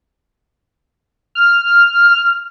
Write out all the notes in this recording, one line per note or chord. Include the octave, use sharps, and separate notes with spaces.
F6